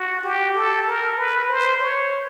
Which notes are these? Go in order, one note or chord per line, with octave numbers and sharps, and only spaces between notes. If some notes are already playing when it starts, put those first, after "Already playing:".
Already playing: F#4
G4
A4
A#4
B4
C5
C#5